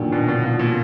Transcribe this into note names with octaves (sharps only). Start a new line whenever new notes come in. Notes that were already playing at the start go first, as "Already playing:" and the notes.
Already playing: A#2 D3 D#3 F#3
B2 D4
B2
B2 F4
A#2